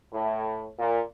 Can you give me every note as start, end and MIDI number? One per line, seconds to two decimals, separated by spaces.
0.13 0.68 45
0.79 1.00 46